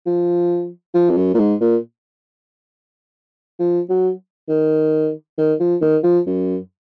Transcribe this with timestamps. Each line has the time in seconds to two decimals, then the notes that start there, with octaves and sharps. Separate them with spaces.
0.06 F3
0.94 F3
1.10 F2
1.17 F#2
1.34 A#2
1.39 G#2
1.61 A#2
3.60 F3
3.89 F#3
4.49 D#3
5.38 D#3
5.60 F3
5.81 D#3
6.03 F3
6.26 F#2